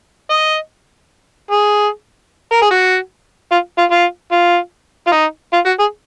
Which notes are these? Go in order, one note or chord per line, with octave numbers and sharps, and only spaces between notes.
D#5
G#4
A#4
G#4
F#4
F4
F4
F4
F4
F4
D#4
F4
F#4
G#4